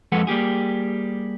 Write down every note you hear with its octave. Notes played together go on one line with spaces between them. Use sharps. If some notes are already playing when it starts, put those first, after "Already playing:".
F2 F3 G#3 A4 B4 F#5
G3 A#3 G4 G#4